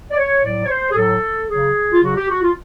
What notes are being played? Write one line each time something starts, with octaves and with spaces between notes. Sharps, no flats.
D5
C#5
A2 F#3 D5
C#5
C5
G#4
A2 F#3 A4
C#3 F#3 G#4
F4
C#3 F#3 F#4
G4
F#4
F4